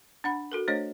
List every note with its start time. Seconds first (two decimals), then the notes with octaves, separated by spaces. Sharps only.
0.24 D4 F#5 B5
0.52 F#4 A4 A#4
0.68 A3 D4 C5 C#5 D#5